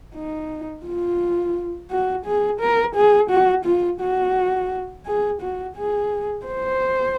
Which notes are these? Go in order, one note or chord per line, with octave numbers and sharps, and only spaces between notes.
D#4
F4
F#4
G#4
A#4
G#4
F#4
F4
F#4
G#4
F#4
G#4
C5